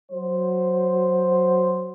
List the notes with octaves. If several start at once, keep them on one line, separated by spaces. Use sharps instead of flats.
F#3 C5